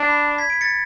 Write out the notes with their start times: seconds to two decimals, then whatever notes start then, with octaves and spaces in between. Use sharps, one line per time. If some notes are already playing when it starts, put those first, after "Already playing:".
Already playing: D4
0.09 B5
0.38 G#6 B6
0.50 B6 D7
0.61 A6 C#7